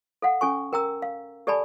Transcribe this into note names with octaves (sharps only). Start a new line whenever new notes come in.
A4 F5 F#5
C#4 A4 G#5 C#6
A#4 G5 A#5 E6
F5
G4 A4 D5 G#5 A5 B5